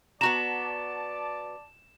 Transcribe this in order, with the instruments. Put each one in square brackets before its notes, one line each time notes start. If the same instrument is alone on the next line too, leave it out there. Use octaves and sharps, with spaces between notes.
[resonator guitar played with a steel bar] B3 F#4 A#5 [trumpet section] D5 A5 [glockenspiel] E7